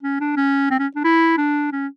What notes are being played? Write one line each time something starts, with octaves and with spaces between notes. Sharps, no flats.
C#4
D4
C#4
C4
C#4
D4
E4
D4
C#4